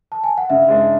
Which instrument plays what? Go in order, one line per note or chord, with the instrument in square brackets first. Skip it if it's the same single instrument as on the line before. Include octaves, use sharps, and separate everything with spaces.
[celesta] A5
G#5
F#5
[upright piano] C#3 [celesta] E5
[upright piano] G#3 D4